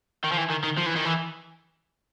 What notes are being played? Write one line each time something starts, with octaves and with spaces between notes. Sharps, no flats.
D#3
F3
E3
D#3
D#3
F3
E3
D#3
E3